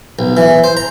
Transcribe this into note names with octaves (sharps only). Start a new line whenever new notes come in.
B1
E3
C5
A#5